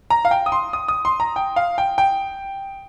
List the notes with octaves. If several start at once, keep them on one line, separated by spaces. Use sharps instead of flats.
A#5
F5
G5
D#6
C6
D#6
D#6
C6
A#5
G5
F5
G5
G5